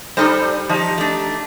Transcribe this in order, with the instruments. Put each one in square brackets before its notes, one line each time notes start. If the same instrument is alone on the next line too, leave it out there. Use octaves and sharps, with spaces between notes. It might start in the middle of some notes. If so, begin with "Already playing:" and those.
[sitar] G3 [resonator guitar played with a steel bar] D#4 A4 C5
[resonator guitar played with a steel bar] F3 [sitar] D#4 G4
[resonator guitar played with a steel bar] A3 D4